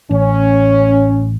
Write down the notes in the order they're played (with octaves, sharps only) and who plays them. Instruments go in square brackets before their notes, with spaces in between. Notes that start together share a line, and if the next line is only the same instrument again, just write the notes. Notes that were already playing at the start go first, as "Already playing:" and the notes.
[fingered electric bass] A1 [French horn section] C#4